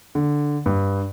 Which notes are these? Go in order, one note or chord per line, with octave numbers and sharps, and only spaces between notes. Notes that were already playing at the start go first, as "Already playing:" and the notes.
D3
G2